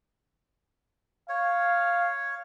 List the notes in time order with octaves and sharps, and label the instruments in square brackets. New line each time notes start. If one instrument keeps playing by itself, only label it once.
[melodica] C#5 [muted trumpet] F5